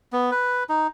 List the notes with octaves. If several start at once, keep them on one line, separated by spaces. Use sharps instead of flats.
B3
B4
D#4